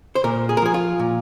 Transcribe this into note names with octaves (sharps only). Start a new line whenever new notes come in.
C5
A#2 A#4
G#4
A#4
F3 G#4
F4
A#2